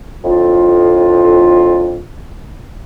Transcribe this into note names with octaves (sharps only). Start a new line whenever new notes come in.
F2 A2 D3 F4